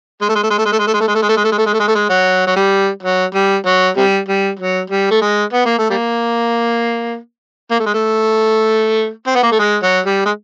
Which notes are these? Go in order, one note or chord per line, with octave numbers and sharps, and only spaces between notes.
G#3
A3
G#3
A3
G#3
A3
G#3
A3
G#3
A3
G#3
A3
G#3
A3
G#3
A3
G#3
A3
G#3
A3
G#3
A3
G#3
A3
G#3
F#3
F#3
G3
F#3
G3
F#3
C3 G3
G3
F#3
G3
A3
G#3
B3
A#3
A3
G3 A#3
A#3
A3
G#3
A3
C4
B3
A#3
A3
G#3
F#3
G3
G#3